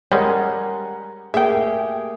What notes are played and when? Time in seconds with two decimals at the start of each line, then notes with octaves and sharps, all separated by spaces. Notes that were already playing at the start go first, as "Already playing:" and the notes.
0.12 G3 G#3 C#4 A#4 F#5
1.34 A3 A#3 G4 G#4 E5 G5